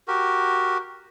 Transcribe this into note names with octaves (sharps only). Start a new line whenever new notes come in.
F#4 G4 A#4